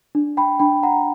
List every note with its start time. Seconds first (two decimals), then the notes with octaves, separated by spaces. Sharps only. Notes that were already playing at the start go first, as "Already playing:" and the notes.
0.15 D4
0.37 G5 B5
0.60 D4 G5 B5
0.83 F#5 A#5